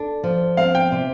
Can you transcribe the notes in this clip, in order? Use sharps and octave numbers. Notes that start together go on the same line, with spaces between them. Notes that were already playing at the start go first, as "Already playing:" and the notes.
Already playing: D4 A4
F3
C4 F5
G5
C3